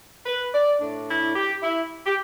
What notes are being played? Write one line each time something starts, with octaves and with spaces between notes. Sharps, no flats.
B4
D5
A2 A3 D4
E4
G4
E4
G4